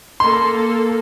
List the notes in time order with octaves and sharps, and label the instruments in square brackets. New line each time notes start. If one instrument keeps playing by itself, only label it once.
[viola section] A#3 A4 [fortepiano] C6